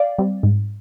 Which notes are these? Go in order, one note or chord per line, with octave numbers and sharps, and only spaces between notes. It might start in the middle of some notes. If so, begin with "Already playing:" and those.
Already playing: D5 F5
G3 C4
G#2